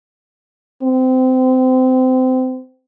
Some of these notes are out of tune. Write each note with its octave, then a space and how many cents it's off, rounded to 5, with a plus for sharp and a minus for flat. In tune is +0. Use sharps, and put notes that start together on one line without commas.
C4 -25